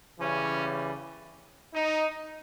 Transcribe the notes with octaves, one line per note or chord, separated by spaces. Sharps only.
C#3 E3 G3 C#4
D#4